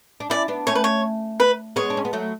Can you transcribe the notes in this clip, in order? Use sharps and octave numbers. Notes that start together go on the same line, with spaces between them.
D4
C#4 E4 D5
B3 D4
A3 C#4 C#5
B4
C#5
B4
G#3 B3 C#5
D4
C#4
B3
F#3 A3